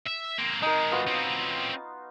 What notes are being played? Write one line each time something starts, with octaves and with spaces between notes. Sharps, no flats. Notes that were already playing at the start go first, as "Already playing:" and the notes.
E5
A#3 C4
D#3 G#3 D#4 A#4
B3 F4 F#4
C4 C#4